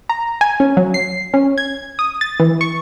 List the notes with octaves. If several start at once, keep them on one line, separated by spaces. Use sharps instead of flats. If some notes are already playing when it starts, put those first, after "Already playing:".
A#5
G#5
C#4
F#3
C7
C#4
G#6
D#6
A6
E3
C#6